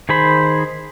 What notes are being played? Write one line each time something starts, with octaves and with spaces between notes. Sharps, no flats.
D#3 G#4 C5 B5